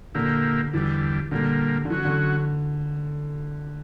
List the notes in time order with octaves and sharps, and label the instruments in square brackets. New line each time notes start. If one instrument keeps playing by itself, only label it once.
[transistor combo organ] A#2 A#3 E4 G4 [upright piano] D3
[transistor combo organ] E2 D3 G3 [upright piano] E3
[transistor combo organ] A#2 G3 A#3 [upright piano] D3
[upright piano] D3
[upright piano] E3 [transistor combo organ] F#3 C#4 F#4
[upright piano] D3